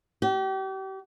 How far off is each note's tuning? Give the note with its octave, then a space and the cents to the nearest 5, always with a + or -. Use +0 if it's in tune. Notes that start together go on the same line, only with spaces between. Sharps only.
G4 -35